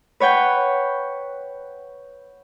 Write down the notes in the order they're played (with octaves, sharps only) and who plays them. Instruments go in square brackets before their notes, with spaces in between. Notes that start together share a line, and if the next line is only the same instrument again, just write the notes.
[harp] B4 C#5 F#5 G5